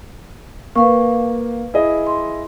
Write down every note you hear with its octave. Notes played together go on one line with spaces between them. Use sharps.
A#3 B4 F5 C#6
E4 G#4 D#5
C6